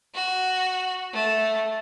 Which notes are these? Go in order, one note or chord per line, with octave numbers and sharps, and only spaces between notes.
F#4
A3